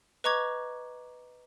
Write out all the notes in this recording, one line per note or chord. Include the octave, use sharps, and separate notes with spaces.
B4 D#5 A#5 C#6 D6 G#6